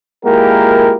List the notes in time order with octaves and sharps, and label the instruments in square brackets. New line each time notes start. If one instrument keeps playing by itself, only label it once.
[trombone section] G#3 A#3 E4 F4 G4 A#4